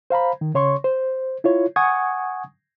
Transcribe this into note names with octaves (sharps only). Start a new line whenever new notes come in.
C5 F5 A#5 B5
D#3
C#3 C#5 C6 C#6
C5
E4 F4 C#5
F#5 G#5 C#6 D#6 G#6